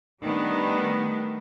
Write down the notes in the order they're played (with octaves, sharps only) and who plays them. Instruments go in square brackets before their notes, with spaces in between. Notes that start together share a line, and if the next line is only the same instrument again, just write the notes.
[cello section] D#3 G3 A3 B3 D4